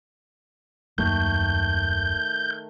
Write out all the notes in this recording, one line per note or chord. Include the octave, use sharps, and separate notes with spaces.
D#1 F#2 D#3 A3 A#3 G6